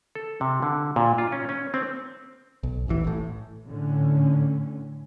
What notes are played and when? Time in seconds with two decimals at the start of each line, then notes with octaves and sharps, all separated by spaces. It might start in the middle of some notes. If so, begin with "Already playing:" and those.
0.15 A4
0.41 C3
0.62 D3
0.96 A#2
1.18 F4
1.32 C#4
1.49 C#4
1.74 C4
2.63 B1
2.88 D#1 A1 E3
3.04 A1 A2
3.67 A2 D3 C#4